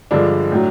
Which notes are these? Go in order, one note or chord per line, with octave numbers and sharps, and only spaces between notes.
G2 D3 F3 G#3 D4
A2 F#3